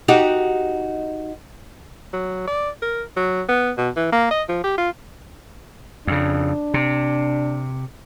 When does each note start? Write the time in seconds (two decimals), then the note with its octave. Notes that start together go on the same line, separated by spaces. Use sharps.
0.08 D#4 F#4 G4
2.13 F#3
2.47 D5
2.82 A#4
3.17 F#3
3.49 B3
3.77 B2
3.96 E3
4.12 A#3
4.31 D#5
4.49 F3
4.64 G4
4.78 F4
6.07 F2 C#3 D4
6.74 C3